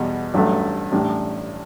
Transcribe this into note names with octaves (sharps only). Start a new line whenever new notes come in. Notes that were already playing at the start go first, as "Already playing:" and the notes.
Already playing: E2 B2 G3
A1 G2 F#3 A3
A1 A2 G3 D4